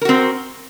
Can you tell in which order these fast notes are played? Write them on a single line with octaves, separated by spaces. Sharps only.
A#4 F#4 C4